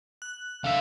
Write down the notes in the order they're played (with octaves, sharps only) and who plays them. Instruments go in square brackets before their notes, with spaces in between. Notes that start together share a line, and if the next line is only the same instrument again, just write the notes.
[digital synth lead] F#6
[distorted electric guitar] D3 E5 [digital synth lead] F5